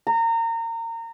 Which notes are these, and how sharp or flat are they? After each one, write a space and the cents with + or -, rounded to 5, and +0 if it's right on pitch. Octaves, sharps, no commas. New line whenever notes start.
A#5 -25